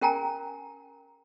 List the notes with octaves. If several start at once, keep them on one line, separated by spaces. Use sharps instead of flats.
C#4 A#4 G5 G#5 A#5